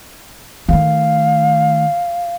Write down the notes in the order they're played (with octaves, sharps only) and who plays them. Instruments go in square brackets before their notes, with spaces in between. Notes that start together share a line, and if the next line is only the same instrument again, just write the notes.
[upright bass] D#3 A3 [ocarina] F5